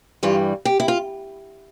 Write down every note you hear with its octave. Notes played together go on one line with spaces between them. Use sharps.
G2 E3 G3 F4
G4
E4
F4